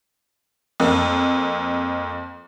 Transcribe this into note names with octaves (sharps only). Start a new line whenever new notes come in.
F2 A#3